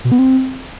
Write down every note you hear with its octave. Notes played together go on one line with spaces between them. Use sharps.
B2
B3
C4